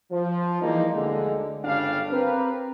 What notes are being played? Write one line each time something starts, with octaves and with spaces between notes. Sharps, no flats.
F3
E3 G3 G#3 A#3 D#4
D2 D3 G#3
G1 C#3 G3 D4 F5
C4 G4 A#4 B4